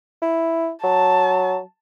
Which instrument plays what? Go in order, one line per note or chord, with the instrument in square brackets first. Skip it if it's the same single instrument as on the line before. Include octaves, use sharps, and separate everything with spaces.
[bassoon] E4
[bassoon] F#3 [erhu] A5